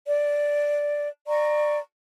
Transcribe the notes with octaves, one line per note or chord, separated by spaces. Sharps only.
D5
D5 A#5 C#6